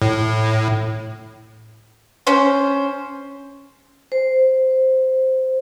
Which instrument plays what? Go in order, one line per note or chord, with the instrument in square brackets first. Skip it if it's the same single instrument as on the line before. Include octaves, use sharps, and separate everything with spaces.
[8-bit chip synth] A2
[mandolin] C#4 C5
[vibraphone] C5